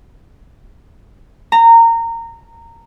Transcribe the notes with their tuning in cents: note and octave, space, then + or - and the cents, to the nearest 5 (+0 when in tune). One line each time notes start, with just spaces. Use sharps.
A#5 -20